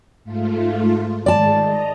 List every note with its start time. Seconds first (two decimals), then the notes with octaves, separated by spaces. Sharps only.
0.24 G#2 A3 F4
1.26 G#2 D#3 G#3 D5 A5
1.60 D#5 A#5